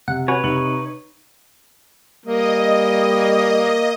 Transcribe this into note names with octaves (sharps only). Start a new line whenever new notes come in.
C3 F#5
C#4 F#4 B4 C#5
C3 D#4 C#7 F#7
G3 A#3 D#5